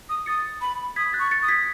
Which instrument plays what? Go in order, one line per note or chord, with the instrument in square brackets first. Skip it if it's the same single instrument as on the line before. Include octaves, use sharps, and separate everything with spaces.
[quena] D#6
[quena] D#6 [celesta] A6 C#7
[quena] B5
[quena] D#6 [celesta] G#6 B6
[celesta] F#6 A6
[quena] C#6
[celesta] A6 C#7
[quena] D#6
[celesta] G#6 B6